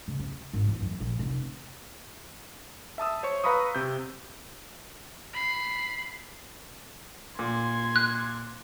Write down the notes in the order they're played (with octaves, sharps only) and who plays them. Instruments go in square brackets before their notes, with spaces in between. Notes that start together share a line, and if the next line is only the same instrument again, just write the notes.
[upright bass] C#3
C#4
G#1
E3
F#2
A#1
F1
[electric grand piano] E5 A5 D#6 E6
C5 C#5 C#6
B4 F5 A#5 B5 C#6 D#6
C3 G6
[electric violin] B5 C7
[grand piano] A#2 [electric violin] C6 G#6
[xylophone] F#6